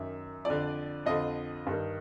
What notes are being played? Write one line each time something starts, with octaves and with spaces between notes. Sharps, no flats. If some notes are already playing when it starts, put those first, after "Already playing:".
Already playing: F#2 D#3 E5
F2 D3 D5
F2 D3 D#5
G2 D#3